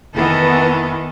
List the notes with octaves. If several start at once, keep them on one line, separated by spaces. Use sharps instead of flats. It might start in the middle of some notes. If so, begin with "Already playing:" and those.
F1 D#3 E3 B3 A4